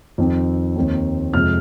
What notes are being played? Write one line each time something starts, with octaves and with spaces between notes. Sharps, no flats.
F2 D#3 C4
D#2 D#3 C4
F2 C3 F3 G#3 F6